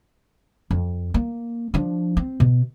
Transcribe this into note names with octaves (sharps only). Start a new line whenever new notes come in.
F2
A#3
F3 D4
C4
B2